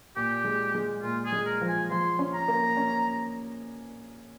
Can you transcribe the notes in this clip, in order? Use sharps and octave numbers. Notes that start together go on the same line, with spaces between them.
A#2 G4
G#3
G#3
A#2 F4
G#4
G#3
A#4
F3
G#5
F3 C6
C#4
A#5
A#3
C#4